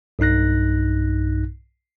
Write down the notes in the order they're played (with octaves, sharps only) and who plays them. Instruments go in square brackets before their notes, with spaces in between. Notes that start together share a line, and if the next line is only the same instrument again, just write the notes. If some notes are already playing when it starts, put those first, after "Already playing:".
[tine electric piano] B1 G2 D#4 F#6 A#6